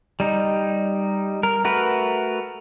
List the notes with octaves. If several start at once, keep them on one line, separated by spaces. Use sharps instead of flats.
G3 D#4
A#4
A3 F#4 A#4 B4